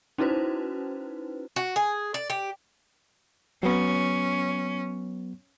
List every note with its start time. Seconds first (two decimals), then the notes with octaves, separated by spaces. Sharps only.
0.18 C#4 D#4 E4 F#4 B4 C5
1.56 F#4
1.76 G#4
2.14 D5
2.30 G4
3.63 F#3 B3 C#4